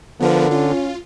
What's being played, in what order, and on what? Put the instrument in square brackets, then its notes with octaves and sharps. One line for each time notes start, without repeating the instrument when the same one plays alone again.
[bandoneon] D3 [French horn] F3 [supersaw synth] B3 A#4 B4
[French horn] C#4 [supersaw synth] F4